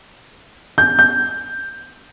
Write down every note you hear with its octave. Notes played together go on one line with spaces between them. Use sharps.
G6
G6